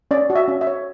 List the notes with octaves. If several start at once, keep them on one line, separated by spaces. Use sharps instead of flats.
C#4 D5
F#4
E5
C#4
E5
C#5